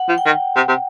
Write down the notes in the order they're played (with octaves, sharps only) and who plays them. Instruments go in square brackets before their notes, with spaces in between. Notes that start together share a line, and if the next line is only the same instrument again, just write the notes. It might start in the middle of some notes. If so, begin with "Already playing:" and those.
Already playing: [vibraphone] F#5
[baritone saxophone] F3
[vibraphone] G5
[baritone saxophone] D#3
C3
C3